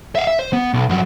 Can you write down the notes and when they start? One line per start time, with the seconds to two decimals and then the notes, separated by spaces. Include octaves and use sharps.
0.15 E5 F5
0.27 E5
0.39 C5
0.53 B3
0.73 B1
0.89 G2 F#3